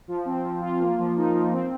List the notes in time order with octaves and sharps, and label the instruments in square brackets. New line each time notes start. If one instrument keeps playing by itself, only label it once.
[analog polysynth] F3
C4
F3
F4
A#3
F3
D#4
F3
C4